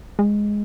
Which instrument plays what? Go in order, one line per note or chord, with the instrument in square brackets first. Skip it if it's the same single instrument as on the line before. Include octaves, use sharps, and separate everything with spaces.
[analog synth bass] G#3